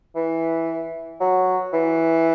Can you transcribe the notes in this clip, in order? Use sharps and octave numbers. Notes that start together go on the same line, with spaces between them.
E3
F#3
E3